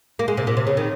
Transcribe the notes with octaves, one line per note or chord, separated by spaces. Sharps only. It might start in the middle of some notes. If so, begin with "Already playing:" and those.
A#3
G#3
C3
A#2
C3
C#3
D#3